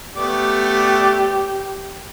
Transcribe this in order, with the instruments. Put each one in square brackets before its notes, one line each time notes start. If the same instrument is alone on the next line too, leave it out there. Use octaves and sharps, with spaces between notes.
[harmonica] A3 B3 D5 [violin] G4